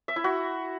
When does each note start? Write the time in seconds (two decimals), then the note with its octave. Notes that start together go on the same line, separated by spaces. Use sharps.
0.08 E5
0.16 E4
0.24 F#4